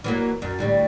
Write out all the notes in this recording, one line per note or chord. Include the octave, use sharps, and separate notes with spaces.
E3 F#3 A#3
F#2
D2 A2 G3